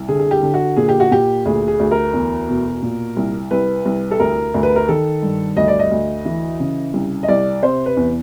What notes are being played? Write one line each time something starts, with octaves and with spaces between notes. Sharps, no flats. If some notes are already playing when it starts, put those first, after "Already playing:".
Already playing: C2
D3 G#4
G#4
G4
D3
F#4
A#2 G#4
G4
F#4
A#2 G4
D2 G#4
G#4
D2
A#4
E2
B2
A#2
C2
C2 B4
C2
A4
D2 A#4
D2
B4
A#4
D#3 A4
G2
D2 D#5
D5
D#5
D2
E3
C#3
C2
D#5
C2 D5
C3 C5
B4
E2